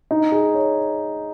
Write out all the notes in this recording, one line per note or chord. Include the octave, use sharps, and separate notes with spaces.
D#4
G#4
C#5